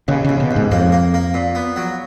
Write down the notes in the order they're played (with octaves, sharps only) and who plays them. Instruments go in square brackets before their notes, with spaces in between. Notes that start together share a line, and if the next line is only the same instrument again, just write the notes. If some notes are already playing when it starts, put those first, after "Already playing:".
[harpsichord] D#2 [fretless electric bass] C#3
[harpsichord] D#2 [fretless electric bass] C#3
[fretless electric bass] B2
[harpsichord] D#2
[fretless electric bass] G#2
[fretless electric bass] F2 [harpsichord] A#3
[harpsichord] A#3
A#3
A#2
B3
F#3